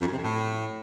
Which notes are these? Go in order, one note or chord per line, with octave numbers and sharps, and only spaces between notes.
F2
F#2
C3
F2
A2